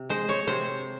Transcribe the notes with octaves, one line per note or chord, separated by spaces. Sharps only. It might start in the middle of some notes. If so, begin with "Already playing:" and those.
Already playing: C3
G#3 C5
C#5
C3 C5